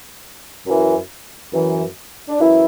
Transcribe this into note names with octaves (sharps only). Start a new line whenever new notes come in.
F#2 E3
F#2 E3
D4
F#2 E3 E4